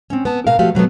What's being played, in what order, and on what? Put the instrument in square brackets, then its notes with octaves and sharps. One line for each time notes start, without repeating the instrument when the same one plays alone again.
[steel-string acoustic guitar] C4 C#4
B3 A5
B2 A#4 F5
F3 A3 F#4 G4 F5
B2 F#3 A3 B3